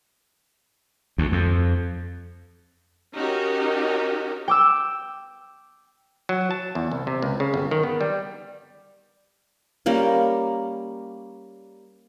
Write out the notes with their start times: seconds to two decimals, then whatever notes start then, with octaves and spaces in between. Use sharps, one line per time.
1.18 D2
1.32 F2
3.15 C#4 D#4 F#4 G4 A#4
4.48 G5 D6 E6
6.29 F#3
6.51 A5
6.75 E2
6.91 C2
7.07 C3
7.23 C#2
7.40 C#3
7.54 G1
7.71 D#3
7.84 B3
8.01 G3
9.86 G3 A#3 C#4